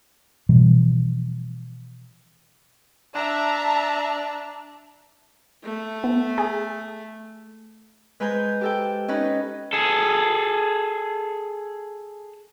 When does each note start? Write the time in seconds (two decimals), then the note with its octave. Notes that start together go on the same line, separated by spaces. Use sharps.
0.49 B2 E3 F3 G3
3.16 D4 E5 A5 A#5
5.63 A3
6.04 B3
6.38 G#4
8.20 G#3 B4 C5 G#5 A#5 G6
8.61 G4 A4 G5
9.08 C#4 D#4 B4 D#5
9.73 G#4 A4